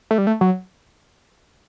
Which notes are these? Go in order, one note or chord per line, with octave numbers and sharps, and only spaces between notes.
A3
G3
A3
F#3